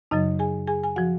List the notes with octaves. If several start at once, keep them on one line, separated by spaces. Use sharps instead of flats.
F#2 C#3 F#3 D#4 D#5
G#4 G#5
G#4 G#5
G#5
F3 F#4 F#5